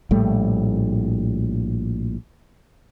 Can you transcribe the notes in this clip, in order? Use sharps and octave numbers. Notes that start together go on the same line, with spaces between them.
A#1 A2 G3 A3